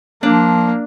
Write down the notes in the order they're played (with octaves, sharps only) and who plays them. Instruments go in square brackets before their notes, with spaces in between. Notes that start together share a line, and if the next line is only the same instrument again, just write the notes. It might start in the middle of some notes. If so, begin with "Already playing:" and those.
[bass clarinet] F3 [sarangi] A#3 [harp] D4